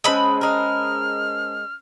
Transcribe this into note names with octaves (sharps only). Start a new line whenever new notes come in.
G#3 C#4 C5 A5 B5 E6
G#3 A#4 F6